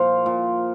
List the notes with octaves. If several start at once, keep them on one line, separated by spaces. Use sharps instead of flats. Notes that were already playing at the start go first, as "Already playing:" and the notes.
Already playing: A#2 F3 C5 F5
A#2